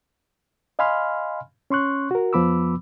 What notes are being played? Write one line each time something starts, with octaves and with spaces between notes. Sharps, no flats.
D#5 F5 G#5 B5 C6 F6
C#4 C6 C#6 F#6
F#4 A#4
F2 F3 B3 B5 D6 E6